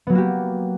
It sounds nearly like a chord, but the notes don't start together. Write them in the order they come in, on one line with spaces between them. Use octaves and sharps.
B3 F#3 A#3 F#4 G4